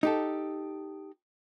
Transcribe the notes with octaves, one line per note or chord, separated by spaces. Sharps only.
D#4 G4 A4